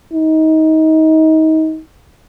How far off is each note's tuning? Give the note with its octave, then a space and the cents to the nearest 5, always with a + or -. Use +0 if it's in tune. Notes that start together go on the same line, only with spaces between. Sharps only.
D#4 +25